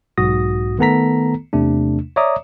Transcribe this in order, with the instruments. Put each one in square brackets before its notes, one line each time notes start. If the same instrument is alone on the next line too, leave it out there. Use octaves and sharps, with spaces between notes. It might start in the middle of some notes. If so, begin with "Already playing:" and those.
[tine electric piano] B1 G#2 F#4 D#6 A#6
D#3 A3 B3 A4 A#5 B6
E2 C3 A3 D4
C#5 D5 E5 A#5 D6 D#6